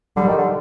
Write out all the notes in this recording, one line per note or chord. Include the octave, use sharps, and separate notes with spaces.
D3 G3
D#3
D3